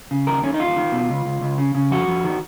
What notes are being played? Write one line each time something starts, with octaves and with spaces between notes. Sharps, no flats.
C#3
D#2 A#4
D#3 C#4
D#4
D#2 F4
D#3
B2
C#2
C#2
C#2
C#3
C#3
F2 F#4
F2
D#3